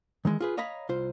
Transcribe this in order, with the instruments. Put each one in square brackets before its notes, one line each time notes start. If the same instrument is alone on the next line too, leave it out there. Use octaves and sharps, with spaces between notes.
[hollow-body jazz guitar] D#3 E3 G#3
F4 G#4 B4
C#5 D#5 F5 A#5 B5
C2 F4 C5